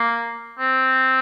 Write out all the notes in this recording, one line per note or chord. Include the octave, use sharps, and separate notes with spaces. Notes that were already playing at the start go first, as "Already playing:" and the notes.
Already playing: A#3
C4